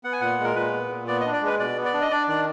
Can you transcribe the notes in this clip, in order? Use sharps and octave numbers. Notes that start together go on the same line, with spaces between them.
B3 F#5
G#5
A#2 F#5
G#3
A#4
A#2 B4
B3
A#2
B3 D5
D#5
D4
D5
G#3 B4
B2 D5
B3
D5
D4
D#5
D4 D5
D#3 D5